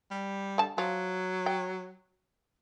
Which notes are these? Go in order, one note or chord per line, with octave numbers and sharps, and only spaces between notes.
G3
D3 A5
F3 F#3
G5